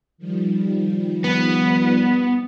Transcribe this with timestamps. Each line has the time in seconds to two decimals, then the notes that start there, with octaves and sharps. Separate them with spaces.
0.18 D#3 F3 G3
1.24 B3